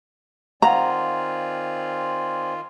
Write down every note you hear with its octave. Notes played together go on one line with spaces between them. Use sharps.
D#3 C4 F4 D5 F5 F#5 G#5 A#5